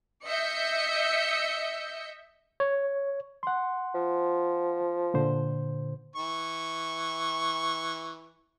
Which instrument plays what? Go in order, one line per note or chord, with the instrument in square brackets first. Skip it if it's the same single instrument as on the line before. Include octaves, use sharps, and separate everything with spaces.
[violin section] D#5 E5 E6 G6 C#7
[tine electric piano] C#5
[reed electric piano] F#5 C6
[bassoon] F3
[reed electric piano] A#2 D3 C5
[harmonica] E3 C#6